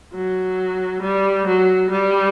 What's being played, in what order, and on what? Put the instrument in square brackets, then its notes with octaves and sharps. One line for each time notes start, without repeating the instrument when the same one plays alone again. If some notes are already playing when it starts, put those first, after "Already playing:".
[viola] F#3
G3
F#3
G3